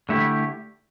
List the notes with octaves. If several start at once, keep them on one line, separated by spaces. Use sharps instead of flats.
D3 A3 E4 G4